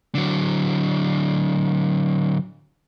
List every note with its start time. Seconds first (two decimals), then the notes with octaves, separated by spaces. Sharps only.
0.15 D3 F#3